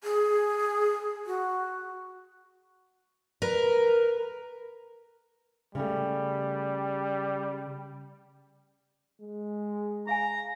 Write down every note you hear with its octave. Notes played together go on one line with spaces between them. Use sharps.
G#4
F#4
A#4 B4
C#3 G3 A3
G#3
G#4 F5 G#5 A#5